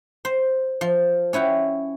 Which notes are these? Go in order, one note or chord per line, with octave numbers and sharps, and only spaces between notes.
C5
F3
C#4 E4 F#5 G5